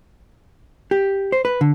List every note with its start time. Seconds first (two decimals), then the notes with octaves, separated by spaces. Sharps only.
0.91 G4
1.32 C5
1.45 B4
1.61 D3